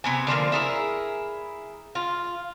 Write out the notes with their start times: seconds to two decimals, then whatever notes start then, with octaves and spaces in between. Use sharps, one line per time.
0.04 C3 B3 G#5
0.27 D3 F3 G#3 A#3
0.52 E4 G#4 A#4
1.95 F4